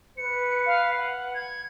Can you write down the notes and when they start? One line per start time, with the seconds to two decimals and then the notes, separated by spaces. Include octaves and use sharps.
0.17 B4 C#7
0.66 F5
0.98 F#5
1.34 G#6